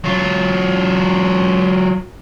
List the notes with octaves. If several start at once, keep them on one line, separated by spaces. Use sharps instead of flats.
F#3 F4